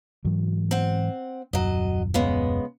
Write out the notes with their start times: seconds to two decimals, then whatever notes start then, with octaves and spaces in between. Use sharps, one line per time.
0.25 G#2 E3 F#3
0.71 C4 F#5
1.53 D#1 F#2 F#3 D#5
2.14 C#3 G#3 B3